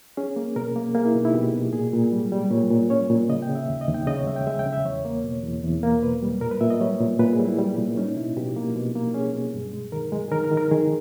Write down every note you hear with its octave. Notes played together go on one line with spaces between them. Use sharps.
C#4 G#4
A#3
B2 A#4
A#3
A#3 G#4
E4
B2 D#4
E4
B2 G4
B2
A#2 G#4
A#2
G3
G3
A#2 C#5
A#2
C#4 C#5
A#2
C#3 D#5
G5
C#3
E5
D#2
D#5
D#2
G5
C#3 D#5
C#5
G#3 E5
G5
G#3 E5
G5
C#3
E5
E2 C#5
A#3
B2
E2
E2
A#3
B2 B4
G3
A#2 A#4
B4
A#2 E5
D#5
G3 C#5
A#2
A#2 B4
G#4
G3
E4
G3
A#2
C#4 D#4
B2 E4
B2 G4
A#3
B2
A#3
C#4 G#4
B2
G2
G#3
D#3 A#4
G#3
G#4
D#3 A#4
A#4
D#3
A#4
D#3 G#4